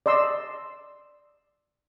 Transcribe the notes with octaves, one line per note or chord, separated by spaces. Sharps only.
D5 D#5 C6 E6